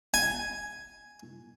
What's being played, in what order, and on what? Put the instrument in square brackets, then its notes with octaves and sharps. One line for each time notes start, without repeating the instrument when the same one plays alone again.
[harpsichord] G#5